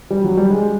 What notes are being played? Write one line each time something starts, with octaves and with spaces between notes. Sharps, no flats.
G3
F#3
G3
G#3